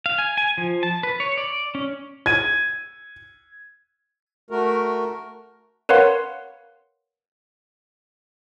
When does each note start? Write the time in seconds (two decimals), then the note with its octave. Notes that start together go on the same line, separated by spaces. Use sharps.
0.06 F5
0.18 G#5
0.38 G#5
0.58 F3
0.83 A5
1.03 B4
1.20 C#5
1.37 D5
1.75 C#4
2.26 G#6 D#7
4.51 A3 F#4 A#4
5.89 A#4 B4 C#5 F5 F#5 C6